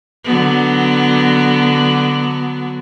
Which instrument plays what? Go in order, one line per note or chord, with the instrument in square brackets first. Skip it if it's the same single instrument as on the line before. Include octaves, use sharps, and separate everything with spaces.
[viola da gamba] D3 F#3 B3